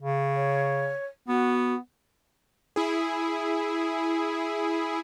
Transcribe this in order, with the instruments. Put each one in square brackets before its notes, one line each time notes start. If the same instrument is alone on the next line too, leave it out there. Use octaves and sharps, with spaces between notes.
[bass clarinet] C#3
[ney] C#5
[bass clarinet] B3 [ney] F#4
[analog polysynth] E4 G#4